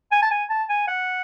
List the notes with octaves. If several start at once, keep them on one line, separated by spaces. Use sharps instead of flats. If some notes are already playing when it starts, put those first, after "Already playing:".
G#5
A5
G#5
A5
G#5
F#5